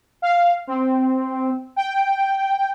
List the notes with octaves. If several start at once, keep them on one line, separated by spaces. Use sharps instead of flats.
F5
C4
G5